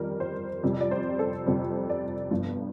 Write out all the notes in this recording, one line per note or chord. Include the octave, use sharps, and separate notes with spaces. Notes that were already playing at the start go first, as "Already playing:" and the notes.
Already playing: F2 D#3 G3 A#4
C5
F2 C3 G3
D5
C5
A4
F2 C3 G3 C5
D5
G1 G2 F3